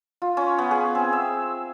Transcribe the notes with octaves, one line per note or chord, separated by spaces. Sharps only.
F4
C#4
B3
G#4
C4
E5